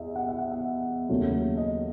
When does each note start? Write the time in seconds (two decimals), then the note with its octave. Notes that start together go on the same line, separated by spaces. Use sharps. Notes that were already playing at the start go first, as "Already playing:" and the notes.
Already playing: E2 D#5 E5
0.16 F#5
0.28 E5
0.38 F#5
0.51 E5
1.09 D#2 C#3 F#3 A3
1.57 D#5